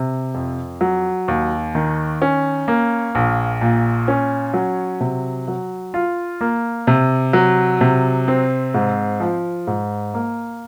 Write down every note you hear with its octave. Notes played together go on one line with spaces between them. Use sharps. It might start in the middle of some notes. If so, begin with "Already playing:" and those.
Already playing: C3
F2
F#3
D#2
D#3
C#4
A#3
A#1
A#2
C#4
F#3
C3
F#3
F4
A#3
C3
F#3
C3
C4
G#2
F3
G#2
A#3